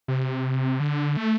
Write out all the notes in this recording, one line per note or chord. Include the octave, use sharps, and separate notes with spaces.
C3
D3
A3